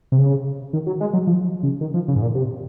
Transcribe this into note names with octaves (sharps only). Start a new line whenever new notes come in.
C3
C#3
D#3
F#3
G#3
F#3
F3
C#3
D#3
F3
C#3
G#2
A#2
C3